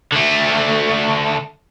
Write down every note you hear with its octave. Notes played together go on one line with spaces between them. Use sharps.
D3 A3